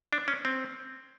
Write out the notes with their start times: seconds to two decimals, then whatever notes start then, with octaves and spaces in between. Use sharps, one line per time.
0.13 D4
0.28 C#4
0.45 C4